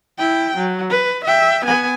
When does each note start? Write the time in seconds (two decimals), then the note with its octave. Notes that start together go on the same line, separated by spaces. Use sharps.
0.18 E4 G5
0.57 F#3
0.90 B4
1.25 E5 G5
1.65 B3 G#5